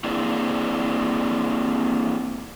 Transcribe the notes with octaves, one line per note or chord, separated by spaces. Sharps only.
A#3 C4 D4 E4 G#4 D5